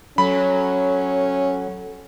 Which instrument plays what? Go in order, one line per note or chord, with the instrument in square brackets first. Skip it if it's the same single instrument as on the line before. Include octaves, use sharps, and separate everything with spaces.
[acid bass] F#3 [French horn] C#4 [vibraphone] A4 [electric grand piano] B5